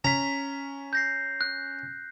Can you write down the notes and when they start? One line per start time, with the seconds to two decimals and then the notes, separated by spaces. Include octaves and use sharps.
0.05 C#4 A#5 B6
0.93 G6 A#6 C7
1.41 F#6